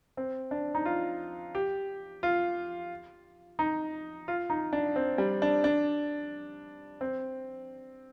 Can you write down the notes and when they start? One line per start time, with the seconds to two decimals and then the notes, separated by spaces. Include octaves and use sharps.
0.17 C4
0.51 D4
0.75 D#4
0.85 F4
1.55 G4
2.23 F4
3.59 D#4
4.28 F4
4.50 D#4
4.73 D4
4.96 C4
5.18 G3
5.42 D4
5.64 D4
7.01 C4